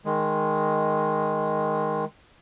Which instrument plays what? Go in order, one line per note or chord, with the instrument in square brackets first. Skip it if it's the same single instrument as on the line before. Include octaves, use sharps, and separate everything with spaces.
[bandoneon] D#3 G#3